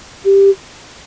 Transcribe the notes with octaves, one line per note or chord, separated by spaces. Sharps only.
G4